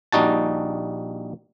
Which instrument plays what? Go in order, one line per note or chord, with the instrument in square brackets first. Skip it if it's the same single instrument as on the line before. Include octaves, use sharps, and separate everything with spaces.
[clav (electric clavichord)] A#1 G3 D#4 F#4 A5